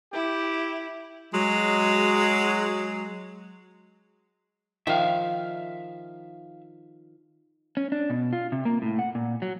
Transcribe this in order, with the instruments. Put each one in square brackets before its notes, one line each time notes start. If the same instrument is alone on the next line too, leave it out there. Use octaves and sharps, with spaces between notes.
[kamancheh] E4 [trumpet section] G4
[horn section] F#3 G#3
[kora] D#3 F3 [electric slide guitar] E5 F5
[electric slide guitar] C#4
D4
B2
F4
C3
A#3
A2
F#5
A#2
F#3